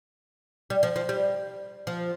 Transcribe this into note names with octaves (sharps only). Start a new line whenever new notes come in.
G3
F3
F3
G3
F3